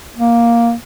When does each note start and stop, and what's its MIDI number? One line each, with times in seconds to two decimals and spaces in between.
0.17 0.73 58